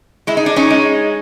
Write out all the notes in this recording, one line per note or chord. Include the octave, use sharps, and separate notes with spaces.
G#3 E4
D#4
D4
C#4 D#4
G#3